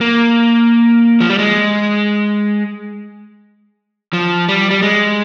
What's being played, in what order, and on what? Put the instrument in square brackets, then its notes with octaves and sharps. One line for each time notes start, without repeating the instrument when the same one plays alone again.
[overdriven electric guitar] A#3
F3
G3
G#3
F3
G3
G3
G#3